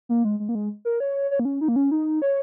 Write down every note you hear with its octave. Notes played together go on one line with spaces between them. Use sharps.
A#3
G#3
G#3
A#3
G#3
A#4
C#5
C#5
A#3
C#4
D#4
A#3
C#4
D#4
C#5